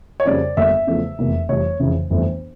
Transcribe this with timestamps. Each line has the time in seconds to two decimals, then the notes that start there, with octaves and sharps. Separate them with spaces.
0.20 C#5
0.25 F2 C#3 G3 A#3 D5
0.57 G1 G2 D3 G3 A#3 E5
0.87 E2 C#3 F3 A3
1.19 F1 E2 E3 A#3
1.49 F1 F2 E3 G3 C#5
1.80 F1 F2 C#3 E3
2.10 G1 F2 E3 A3